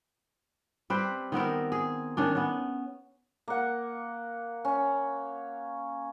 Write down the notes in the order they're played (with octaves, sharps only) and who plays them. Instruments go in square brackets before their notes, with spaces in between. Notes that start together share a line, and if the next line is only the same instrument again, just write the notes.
[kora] G3 C4 B4 C5
D#3 B3 C4 A#4
G#4
D#3 C#4 D4
B3 C#4
[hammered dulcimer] A#3 F#5
C#4